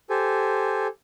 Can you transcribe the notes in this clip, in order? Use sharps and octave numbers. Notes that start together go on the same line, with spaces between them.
G4 A4 C5 G#5